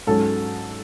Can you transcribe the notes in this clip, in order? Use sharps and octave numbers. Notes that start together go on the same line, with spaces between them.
G#2 F#3 C#4 A4